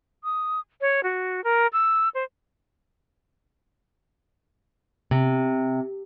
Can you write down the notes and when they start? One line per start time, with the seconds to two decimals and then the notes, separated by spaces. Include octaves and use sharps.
0.24 D#6
0.81 C#5
1.04 F#4
1.44 A#4
1.73 E6
2.15 C5
5.11 C3